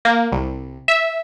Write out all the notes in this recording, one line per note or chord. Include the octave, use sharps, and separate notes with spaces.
A#3
C2
E5